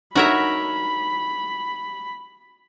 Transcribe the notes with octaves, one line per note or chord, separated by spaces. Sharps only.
D4 D#4 F#4 A#4 C#5 E5 B5